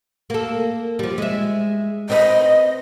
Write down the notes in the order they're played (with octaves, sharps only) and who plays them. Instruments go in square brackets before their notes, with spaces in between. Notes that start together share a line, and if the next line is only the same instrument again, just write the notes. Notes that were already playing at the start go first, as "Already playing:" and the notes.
[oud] A#3 A4
F3 G3
G#3 E5
[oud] C4 B4 [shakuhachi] D#5